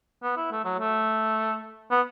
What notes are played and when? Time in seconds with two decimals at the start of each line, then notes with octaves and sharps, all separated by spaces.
0.23 B3
0.36 E4
0.51 A3
0.64 F#3
0.79 A3
1.91 B3